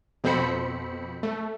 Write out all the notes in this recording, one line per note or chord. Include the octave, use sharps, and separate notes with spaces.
F2 B2 C4 C5 B5 C#7
A3